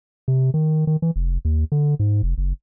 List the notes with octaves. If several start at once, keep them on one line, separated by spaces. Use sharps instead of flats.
C3
D#3
D#3
E3
F1
D#2
D3
G#2
F1
F#1